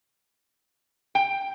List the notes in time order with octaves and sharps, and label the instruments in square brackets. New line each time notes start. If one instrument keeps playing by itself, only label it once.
[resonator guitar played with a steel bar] G5